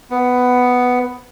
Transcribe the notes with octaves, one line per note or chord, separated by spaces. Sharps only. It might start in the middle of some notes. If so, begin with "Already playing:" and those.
B3